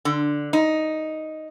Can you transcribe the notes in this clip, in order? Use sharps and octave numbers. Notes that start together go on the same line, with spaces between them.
D3
D#4